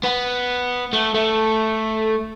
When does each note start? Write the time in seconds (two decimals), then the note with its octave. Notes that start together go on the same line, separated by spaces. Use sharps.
0.04 B3
0.93 A3
1.14 A3